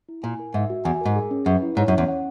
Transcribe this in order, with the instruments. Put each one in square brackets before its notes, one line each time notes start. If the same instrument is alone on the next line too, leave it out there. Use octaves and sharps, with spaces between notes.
[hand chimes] E4
[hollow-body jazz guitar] A#2 [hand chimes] G#5
[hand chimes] A#4
[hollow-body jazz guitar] G#2 [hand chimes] E5
[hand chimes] F#4
[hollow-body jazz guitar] E2 [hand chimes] G#5
[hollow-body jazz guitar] G#2 [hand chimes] A#4
[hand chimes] G#4
C#4
[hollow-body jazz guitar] F#2 [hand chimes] B4
[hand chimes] E4
[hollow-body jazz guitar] G#2 [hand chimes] C#5
[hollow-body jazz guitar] F#2
[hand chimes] C#4
[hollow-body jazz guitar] E2
[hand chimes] F#5